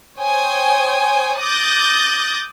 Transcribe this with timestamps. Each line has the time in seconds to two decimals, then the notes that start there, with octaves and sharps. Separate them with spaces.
0.19 C5 C#5 G5 G#5 D#6
1.39 D6 D#6 F#6 G6 A6 A#6